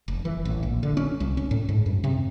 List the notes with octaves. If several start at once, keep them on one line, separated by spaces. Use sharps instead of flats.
F1
E3
A1
A#1
D3
C#4
C2
C#4
A2
G#2
F#2
C3